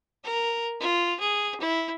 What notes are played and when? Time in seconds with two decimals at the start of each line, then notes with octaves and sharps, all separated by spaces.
0.24 A#4
0.80 F4
1.20 G#4
1.60 E4